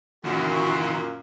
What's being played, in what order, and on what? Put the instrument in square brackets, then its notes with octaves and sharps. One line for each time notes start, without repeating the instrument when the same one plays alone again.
[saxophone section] F#2 A#2 [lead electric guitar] D#3 E3 [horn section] F#4